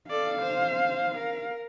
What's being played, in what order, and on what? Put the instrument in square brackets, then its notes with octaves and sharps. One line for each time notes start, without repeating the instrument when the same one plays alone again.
[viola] A4 D5 [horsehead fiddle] F5
[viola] C5
A#4